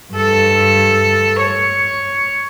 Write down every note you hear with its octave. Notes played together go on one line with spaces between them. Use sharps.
G2 A4
C#5